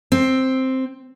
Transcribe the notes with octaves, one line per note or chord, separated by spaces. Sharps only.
C4